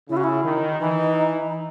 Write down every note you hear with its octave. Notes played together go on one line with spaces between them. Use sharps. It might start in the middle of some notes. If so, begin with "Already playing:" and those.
C#3 E4
F#4
E4
D#3
E3 D#4